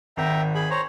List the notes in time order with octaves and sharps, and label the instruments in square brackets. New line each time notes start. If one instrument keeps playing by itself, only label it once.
[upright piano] G#1 [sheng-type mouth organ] E5 G5 A#5
[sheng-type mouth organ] G#4 B5
C5 C#5 A#5